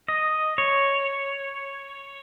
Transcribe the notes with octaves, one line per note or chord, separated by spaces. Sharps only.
D#5
C#5